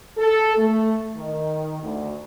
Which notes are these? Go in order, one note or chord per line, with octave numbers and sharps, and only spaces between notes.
A4
A3
D#3
D2